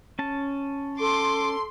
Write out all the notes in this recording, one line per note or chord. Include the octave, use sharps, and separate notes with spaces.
C#4 A5
A4 C6 D6